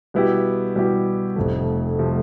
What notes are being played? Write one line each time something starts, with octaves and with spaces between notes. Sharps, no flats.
B2 G3 B3 E4 G4
B2 G3 B3 E4 G4
F1 F2 C3 F3 A3
C3 F3 A3